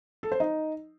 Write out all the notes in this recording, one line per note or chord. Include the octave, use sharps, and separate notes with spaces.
A4
C5
D#4